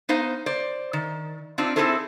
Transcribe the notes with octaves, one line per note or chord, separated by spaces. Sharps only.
B3 D#4 C5 F5
C5 D5
D#3
C4 D4 D#4 F4
C4 D#4 E4 G#4 A4 C5